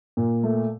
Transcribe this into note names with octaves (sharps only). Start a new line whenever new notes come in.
A#2
A3